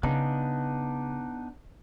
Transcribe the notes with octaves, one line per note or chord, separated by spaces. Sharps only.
C#3 B3 D4 D#4